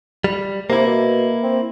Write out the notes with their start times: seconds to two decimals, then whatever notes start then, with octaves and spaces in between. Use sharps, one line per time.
0.24 G3
0.70 C3 A#3 E4
0.86 B2
1.43 C4